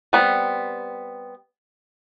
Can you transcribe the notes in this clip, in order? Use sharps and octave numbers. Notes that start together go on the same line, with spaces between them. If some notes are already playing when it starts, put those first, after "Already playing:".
G3 B3 C4